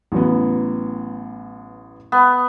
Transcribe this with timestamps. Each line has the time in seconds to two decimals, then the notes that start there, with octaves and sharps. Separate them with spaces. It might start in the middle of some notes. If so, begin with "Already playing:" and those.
0.12 A1 F#3 B3
2.12 B3